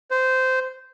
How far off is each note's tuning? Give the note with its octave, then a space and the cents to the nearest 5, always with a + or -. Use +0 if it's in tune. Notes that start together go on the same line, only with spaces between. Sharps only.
C5 -15